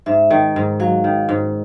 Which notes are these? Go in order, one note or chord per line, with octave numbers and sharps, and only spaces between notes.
G#2 E5
D#3
G#2
F#3 F5
D#3
G#2